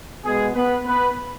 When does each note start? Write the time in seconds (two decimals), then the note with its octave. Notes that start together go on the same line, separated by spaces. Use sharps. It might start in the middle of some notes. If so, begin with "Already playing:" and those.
0.24 B2 G#3 B3 G#4
0.54 B3 B4
0.85 B3 B4